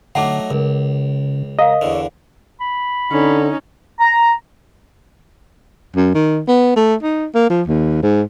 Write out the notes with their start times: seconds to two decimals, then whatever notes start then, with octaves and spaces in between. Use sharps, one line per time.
0.15 D3 F#3 A3 D#4 F#5 A5 D6
0.51 C#2 C#3 A#4
1.59 A#4 D#5 F5 A#5
1.82 E2 D3 C#5 D5 E5
2.60 B5
3.12 D3 C#4 D#4
4.00 A#5
5.96 F#2
6.15 D#3
6.48 B3
6.76 A3
7.02 D#4
7.35 A#3
7.50 F3
7.67 D#2
8.03 G#2